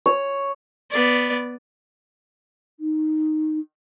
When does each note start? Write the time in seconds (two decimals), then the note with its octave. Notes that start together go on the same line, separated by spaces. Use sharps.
0.06 C#5
0.91 B3 D5
2.80 D#4